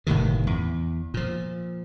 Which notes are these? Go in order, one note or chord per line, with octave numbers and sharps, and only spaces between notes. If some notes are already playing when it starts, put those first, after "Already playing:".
G1 A2 C3 D#3
E2
A#2 F3